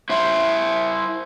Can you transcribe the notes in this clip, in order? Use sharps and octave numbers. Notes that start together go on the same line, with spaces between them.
E4 C5